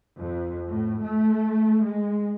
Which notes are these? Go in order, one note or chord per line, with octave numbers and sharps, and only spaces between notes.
F2
A2
A3
G#3